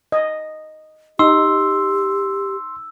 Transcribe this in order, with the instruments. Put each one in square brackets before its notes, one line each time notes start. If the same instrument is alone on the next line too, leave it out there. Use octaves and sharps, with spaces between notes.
[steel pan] D#5
[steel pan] D#4 [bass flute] G4 [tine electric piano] C6 [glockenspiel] E6